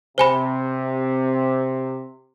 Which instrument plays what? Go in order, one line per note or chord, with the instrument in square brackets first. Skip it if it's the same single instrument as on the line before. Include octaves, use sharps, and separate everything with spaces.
[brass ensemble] C3 [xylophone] C5 G#5 B5